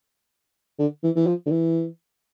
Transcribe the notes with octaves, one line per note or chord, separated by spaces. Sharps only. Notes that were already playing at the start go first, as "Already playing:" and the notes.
D3
E3
E3
F3
D3
E3